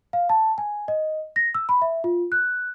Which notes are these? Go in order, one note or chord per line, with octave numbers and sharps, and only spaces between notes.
F5
A5
G#5
D#5
A#6
E6
B5
E5
F4
F#6